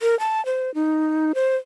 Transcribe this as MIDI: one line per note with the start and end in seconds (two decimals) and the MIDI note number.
0.01 0.18 70
0.19 0.44 81
0.46 0.74 72
0.74 1.32 63
1.35 1.56 72